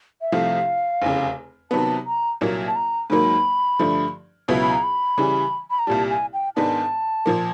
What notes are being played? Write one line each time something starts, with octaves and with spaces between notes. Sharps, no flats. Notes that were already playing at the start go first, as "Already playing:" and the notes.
E5
C2 C3 F3 A3 F5
F1 E2 C#3
C3 D#3 F#3 B3 A5
A#5
C2 A#2 F#3 A#3
A5
A#5
G#2 D#3 F#3 A#3 B5
G2 D3 F3 A3
C#2 B2 F#3 B3 E4
B5
A#5
B5
C#3 E3 G3
B5
A#5
C2 A#2 G3 A5
G#5
G5
G#2 D#3 G#3 B3 D4 A5
A#2 F3 A#3